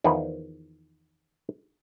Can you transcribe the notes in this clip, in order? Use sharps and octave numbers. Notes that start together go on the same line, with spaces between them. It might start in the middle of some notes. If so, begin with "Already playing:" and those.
E2 D#3 F3 B4